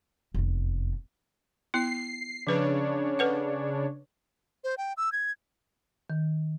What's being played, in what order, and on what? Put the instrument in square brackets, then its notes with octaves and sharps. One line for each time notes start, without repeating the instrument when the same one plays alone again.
[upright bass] F1 E2
[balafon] B3 E4 [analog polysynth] C7
[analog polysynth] C#3 D4 C#5 [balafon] F3 B4
[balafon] A4 B4 F#5
[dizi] C5
G5
E6
G#6
[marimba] D#3